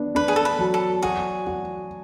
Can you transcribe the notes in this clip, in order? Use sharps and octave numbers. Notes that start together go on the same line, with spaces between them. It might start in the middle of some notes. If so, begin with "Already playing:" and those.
Already playing: B3 D4
D4 B4
G#4
A4
B4
F#3
A4
F#4 G#4
F#4